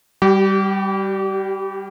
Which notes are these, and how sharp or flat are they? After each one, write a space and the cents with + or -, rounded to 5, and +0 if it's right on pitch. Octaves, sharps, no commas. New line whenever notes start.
G3 +0 G4 -35